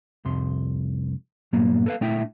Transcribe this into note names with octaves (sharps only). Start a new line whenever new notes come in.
C2 F2 C6
G2 A#2 F#3 A#3 B3
A4 B4 F5
A#2 A3 D4 E4 E5 G5